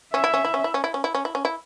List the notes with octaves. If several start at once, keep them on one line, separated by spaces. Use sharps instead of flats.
C#4 E5
E4
C#4
E4
C#4
E4
C#4
E4
C#4
E4
C#4
E4
C#4
E4